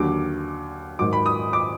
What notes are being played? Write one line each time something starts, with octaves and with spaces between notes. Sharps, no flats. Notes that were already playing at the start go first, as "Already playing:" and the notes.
Already playing: D#2 D3 F#3 D6
G#2 D#3 F#3 D6
B5
D#6
D6